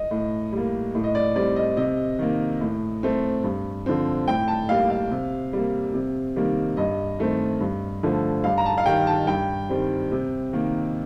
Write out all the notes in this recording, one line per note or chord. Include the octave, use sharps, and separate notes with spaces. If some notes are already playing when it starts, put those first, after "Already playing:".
Already playing: D#5
A2
G3 A#3
A2
D#5
D5
G3 C4 D5
D#5
C3 D#5
D#3 A#3
A2
A3 C4
G2
D3 F3 C4
A2 G5
A5
G3 A#3 F5
F5
C3
G3 A#3
C3
D#3 G3 A#3
G2 D#5
D#3 A3 C4
G2
D3 F3 A3
G2 F5
A#5
A5
F5
D#3 G3 G5
A5
G2 G5
D#3 G3 C4
C3
D#3 A#3